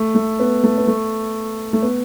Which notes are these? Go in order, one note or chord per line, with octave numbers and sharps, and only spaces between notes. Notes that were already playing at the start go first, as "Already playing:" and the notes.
Already playing: A3
A3
B3
A3
B3
A3
A3
B3